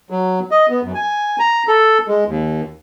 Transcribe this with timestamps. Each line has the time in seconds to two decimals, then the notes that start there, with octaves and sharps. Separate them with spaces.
0.10 F#3
0.51 D#5
0.69 B3
0.82 F#2
0.95 G#5
1.40 A#5
1.68 A4
2.08 G#3
2.27 D#2